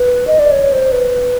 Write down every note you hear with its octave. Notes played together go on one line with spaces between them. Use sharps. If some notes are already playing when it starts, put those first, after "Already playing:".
Already playing: B4
D#5
D5
C#5
C5
B4